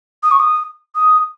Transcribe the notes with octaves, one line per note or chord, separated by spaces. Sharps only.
D#6
C#6
D#6
D#6